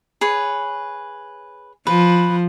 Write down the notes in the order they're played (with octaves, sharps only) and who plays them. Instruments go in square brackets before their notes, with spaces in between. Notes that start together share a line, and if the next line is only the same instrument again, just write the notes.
[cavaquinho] G#4 B4 C#5
[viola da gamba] F3 [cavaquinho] B4